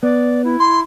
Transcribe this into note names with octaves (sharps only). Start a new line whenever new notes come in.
B3 D5
E4
C6